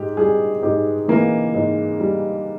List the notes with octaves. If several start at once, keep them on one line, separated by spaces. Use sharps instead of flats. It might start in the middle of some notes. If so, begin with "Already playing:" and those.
Already playing: G#2 G4
G3 G#4
G#2 G4
E3 A#3
G#2
G3